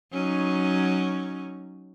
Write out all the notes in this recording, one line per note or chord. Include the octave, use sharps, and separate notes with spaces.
F#3 C#4 D#4